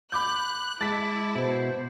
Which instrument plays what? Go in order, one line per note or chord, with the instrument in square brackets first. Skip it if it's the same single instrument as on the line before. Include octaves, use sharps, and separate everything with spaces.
[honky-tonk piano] B5 D6 G6 [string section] F#6
[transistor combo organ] G#3 A5 D6 [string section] E4 [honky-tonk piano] A6 B6
[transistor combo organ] B2 [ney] C5